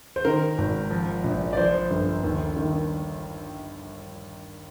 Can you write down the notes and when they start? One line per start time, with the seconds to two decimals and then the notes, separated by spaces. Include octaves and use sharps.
0.16 C5
0.25 D#3 A#4
0.58 G#1
0.91 F3
1.24 A#1
1.53 D5
1.57 F3 C5
1.90 G1
2.23 D#2
2.56 D#3